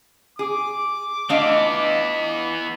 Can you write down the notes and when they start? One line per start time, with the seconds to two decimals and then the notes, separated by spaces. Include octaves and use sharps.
0.39 G#4 D6
1.29 E3 A3 B3 D4 F4 D#5 F5